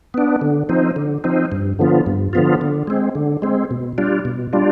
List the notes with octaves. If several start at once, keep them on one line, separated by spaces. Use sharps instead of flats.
B3 D4
D3
F3 C4 D#4
D3
F3 C4 D#4
G2
D3 F3 B3 F4
G2
D3 F3 B3 F4
D3
G#3 C4
D3
G#3 C4
B2
G3 D4 F4
B2
G3 D4 F4